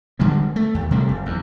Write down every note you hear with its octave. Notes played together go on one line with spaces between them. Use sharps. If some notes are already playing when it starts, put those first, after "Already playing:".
D3 G3 G#3
A3
D#2
C3 G3 A3
F#1
E2